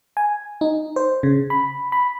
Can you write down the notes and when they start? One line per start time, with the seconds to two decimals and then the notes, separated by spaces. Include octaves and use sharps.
0.17 G#5
0.61 D#4
0.96 C5
1.23 C#3
1.50 B5
1.92 B5